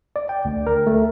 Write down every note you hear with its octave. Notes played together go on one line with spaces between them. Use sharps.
D5
G5
D2
A#4
A3